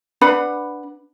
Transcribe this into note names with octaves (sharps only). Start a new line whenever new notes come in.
D4 B4 F#5 B5